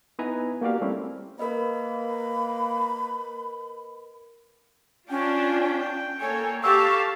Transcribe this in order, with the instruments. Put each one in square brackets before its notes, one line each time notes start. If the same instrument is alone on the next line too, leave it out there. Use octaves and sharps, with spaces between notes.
[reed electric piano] B3 D#4 E4 B4 G#5 A#5
A#3 F#4 G4 D5 F5
G3 A3 C4 C#4 E4 G4
[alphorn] A#3 [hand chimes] A#4 B4 D#5 [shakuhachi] B5
[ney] C#4 [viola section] D4 F4 [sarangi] G5
[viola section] A#3 A4 C#5 [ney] G#5
[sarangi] G4 [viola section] A4 F5 A5 [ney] C#6 [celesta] E6